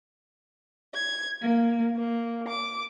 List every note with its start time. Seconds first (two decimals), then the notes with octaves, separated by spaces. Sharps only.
0.94 G#6
1.41 A#3
1.96 A#3
2.47 D6